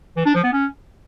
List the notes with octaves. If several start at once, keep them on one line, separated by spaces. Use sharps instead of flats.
E3
D4
F3
B3
C#4